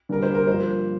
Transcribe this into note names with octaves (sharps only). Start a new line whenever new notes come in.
D3 G3 A#3 D4 A#4
C5
A#4
G2 F3 A#3 C5